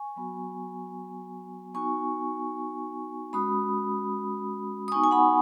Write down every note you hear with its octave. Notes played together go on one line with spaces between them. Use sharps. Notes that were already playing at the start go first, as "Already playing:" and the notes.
Already playing: G#5 C#6
F#3 B3 F#4
B3 D#4 F#4 G#5 C#6
G#3 C#4 F#4 B5 D#6
D#6
B3 D#4 F#4 G#5 C#6
G#5
F#5 B5